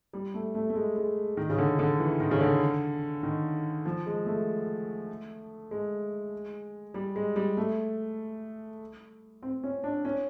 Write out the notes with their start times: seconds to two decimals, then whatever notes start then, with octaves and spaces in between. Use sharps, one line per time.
0.13 G3
0.34 A3
0.55 A3
0.70 A3
0.76 G#3
0.96 G#3
1.37 D#3
1.50 C#3
1.58 D3
1.79 D3
1.99 E3
2.20 D#3
2.31 C#3
2.41 D3
3.23 D#3
3.85 F3
4.06 G#3
4.26 A3
5.71 G#3
6.94 G3
7.16 G#3
7.36 G3
7.57 A3
9.43 C4
9.64 C#4
9.84 D4
10.05 C#4